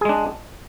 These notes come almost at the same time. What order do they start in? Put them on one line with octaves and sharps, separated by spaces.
G#4 G#3 D4